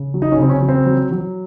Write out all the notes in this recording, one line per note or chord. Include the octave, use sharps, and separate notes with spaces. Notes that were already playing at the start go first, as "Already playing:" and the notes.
Already playing: C#3
F#3
D#4
C#4
C#3 C4
C#4
F#3
C4
F#3
F#3